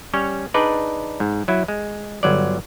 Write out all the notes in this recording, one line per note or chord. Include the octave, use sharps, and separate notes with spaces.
G3 C#4 C#5
D4 D#4 G#4 B4 D5
G#2
F#3 E4
G#3
G1 F#3 D5